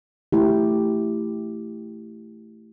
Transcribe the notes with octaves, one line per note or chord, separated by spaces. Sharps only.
A3 E4 G4